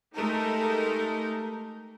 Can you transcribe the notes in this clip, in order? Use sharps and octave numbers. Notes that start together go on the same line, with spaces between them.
G#3 A3 D#4 G4 A4 A#4